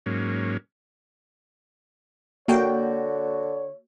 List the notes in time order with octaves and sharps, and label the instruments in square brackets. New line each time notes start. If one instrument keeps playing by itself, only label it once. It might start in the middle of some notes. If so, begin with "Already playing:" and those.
[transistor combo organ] G#2 F#3 A#3 C#4
[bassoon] D3 [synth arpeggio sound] A#3 A4 G5 [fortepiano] F#4 [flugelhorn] C#5